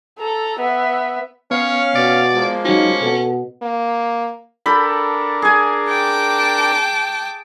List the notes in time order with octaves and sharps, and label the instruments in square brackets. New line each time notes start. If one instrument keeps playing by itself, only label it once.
[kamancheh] A4 A#5
B3 E5
[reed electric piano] B3 [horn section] C#4 F5 [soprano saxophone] C#5
[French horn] B2 [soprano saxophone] D5
[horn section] F3 G#3 A#3
[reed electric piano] F#3 F#4 [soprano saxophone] C#4 [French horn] D#4
[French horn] B2 [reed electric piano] A4
[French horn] A#3
[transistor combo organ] D4 A#4 [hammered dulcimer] A4 G5 B5
[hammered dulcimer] G#4 G#5
[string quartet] G5 A5 D6